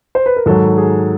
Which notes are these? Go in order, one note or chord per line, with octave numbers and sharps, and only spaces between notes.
C5
B4
A#4
G#2 D#3 F#3 A4
G#4